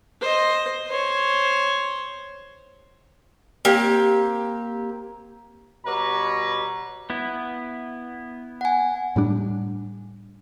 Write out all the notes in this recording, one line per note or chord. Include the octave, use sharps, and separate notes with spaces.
C5 D#5
C5 C#5
A#3 C4 G4
B2 G3 B4 C#5 A#5
B3 E4
F#5 G#5
A2 G3 D4